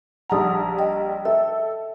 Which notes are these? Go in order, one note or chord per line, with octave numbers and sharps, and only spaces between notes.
A#1 G3 F#5 A5 A#5 D#6
D#5 G5
A4 E5